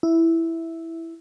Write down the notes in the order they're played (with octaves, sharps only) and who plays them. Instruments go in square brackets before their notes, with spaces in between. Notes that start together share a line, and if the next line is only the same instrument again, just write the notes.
[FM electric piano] E4